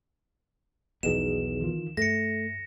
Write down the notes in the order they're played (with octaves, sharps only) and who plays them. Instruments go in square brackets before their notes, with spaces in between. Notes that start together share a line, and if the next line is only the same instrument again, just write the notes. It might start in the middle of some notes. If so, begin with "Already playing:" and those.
[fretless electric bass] B1 E2 B2 [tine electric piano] F3 D#4 G#4 [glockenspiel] E7
[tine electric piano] D#3 E3 F4
[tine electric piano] G2 [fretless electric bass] A3 [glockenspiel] A#6 C#7